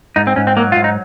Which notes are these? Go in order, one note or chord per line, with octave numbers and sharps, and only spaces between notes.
G#2 D#4
C4
G#2 C#4
C4
F#3 A#3
G#2 F4
D#4